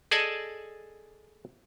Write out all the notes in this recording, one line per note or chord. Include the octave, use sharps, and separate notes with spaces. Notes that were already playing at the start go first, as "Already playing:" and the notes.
G#4 A4 D5 D#5 G#5 A5